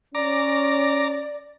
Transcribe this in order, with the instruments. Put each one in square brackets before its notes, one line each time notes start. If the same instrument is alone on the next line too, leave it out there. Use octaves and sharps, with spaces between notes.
[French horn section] C#4 [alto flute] D5 [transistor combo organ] A#5 D6